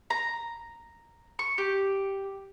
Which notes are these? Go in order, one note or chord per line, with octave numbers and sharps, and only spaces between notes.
A#5
C#6
G4